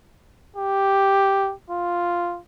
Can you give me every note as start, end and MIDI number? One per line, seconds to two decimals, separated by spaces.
0.56 1.53 67
1.70 2.40 65